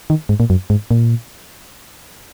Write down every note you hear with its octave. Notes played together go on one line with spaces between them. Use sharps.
D#3
G#2
A#2
F#2
G#2
A#2